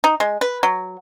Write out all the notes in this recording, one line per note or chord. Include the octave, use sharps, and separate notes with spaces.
D#4
G#3
B4
F#3